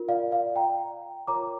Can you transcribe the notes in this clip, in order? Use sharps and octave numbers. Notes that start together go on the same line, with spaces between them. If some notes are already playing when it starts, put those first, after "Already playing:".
Already playing: F4 A#4
D5 F5
D5 F5
G5 A#5
F4 A#4 C#5 A#5 D6